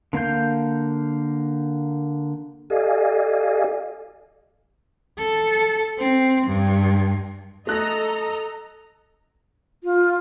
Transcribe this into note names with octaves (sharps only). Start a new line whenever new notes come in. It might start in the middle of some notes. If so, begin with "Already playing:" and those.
D3 A#3 F5 G6
G4 A4 D5 D#5 F5 G#5
A4
C4
G2
A3 A4 D#5 A#5 F#6 A#6
F4